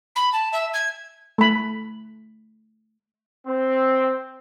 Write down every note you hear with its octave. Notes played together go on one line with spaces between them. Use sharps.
B5
A5
E5
G#6
A3 B5
C4